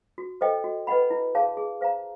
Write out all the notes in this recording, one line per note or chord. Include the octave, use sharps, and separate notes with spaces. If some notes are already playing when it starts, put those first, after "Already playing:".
F#4
A4 C5 D#5 G5
F#4
B4 D#5 F#5 B5
E4
G#4 C#5 F5 A5
G#4
C5 F5 A#5